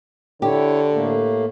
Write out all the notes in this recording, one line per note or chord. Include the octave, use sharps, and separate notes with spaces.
D3 E4 G4 C#5
A2 A3 A#3